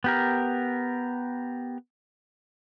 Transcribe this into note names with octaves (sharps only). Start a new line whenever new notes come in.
B3 G4 A#4